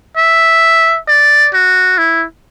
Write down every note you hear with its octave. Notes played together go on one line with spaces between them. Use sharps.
E5
D5
F#4
E4